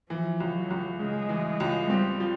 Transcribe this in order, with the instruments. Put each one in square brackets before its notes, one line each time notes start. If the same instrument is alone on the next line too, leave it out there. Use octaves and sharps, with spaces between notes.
[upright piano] E3 [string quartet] F3
[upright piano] C#2
[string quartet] F#3
[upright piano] C#2
[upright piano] C#3 [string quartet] G#3
[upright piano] E3
C#2
[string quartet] G3 [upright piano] C4
[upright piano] F3